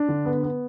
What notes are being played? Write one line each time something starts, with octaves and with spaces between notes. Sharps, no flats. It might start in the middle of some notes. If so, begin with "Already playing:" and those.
Already playing: D4
D3
B3
B3